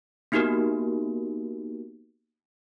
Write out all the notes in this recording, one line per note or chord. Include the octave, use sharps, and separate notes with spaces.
A#3 B3 D#4 F#4 G4 A#4